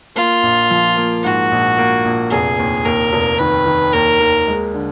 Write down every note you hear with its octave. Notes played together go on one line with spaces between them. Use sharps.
A#3 F4
A#1
F3
A#3
G#2 F#4
A#1
A#3
A#1
F1 G#4
D#2
D#2 A#4
F1
D#3 B4
D#3
D#2 A#4
D#2
G#3
D3